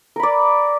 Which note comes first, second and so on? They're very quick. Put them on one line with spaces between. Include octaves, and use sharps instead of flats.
A#4 B5 D5